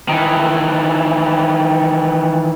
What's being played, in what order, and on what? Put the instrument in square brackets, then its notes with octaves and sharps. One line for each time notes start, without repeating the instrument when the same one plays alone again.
[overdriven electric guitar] D#3 E3